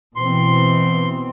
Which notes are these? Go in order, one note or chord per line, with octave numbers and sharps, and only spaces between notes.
B2 E3 C4 C6